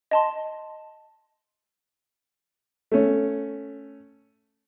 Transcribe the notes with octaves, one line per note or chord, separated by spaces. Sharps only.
D#5 A5 C6
A3 C#4